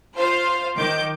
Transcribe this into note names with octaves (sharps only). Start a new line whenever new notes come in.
F4 C5 F5
D#3 D6 G6